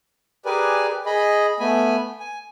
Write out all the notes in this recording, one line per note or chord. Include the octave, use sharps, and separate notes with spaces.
G4 G#4 A#4 B4 D5 G#5
G#4 D#5 B5
A3 B3 G#5 B5
G#5